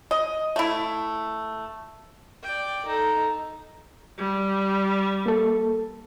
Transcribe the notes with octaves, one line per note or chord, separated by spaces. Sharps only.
D#5
A3 E4
D5 G5
D#4 A4
G3
A#3 A4